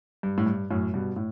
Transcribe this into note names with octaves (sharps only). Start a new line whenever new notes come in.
G2
A2
G2
F#2 A2
G2 B2
A2